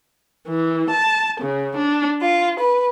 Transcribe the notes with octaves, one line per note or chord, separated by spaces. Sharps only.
E3
A5
C#3
D4
F4
B4